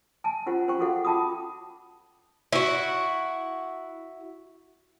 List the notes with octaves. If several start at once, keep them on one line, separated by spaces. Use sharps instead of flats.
G#5 A5
C#4 F4 G4 C5 F#5
C#4 C5 G5 C#6
F#4 G#4 A4 F5 F#5
F4 G5 A5 B5 D6 D#6
E4 F#4